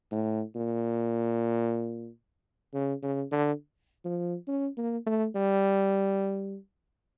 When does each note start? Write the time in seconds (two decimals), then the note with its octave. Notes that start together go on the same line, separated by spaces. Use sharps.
0.12 A2
0.56 A#2
2.73 C#3
3.03 C#3
3.32 D3
4.05 F3
4.48 C#4
4.77 A#3
5.06 A3
5.35 G3